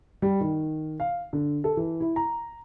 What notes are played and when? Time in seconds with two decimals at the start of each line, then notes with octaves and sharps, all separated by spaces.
0.22 G3
0.41 D#3
1.00 F5
1.33 D3
1.64 A4
1.77 E3
2.00 E4
2.16 A#5